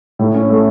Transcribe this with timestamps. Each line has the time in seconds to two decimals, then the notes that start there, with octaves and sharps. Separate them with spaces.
0.19 A2
0.34 C#4
0.50 A3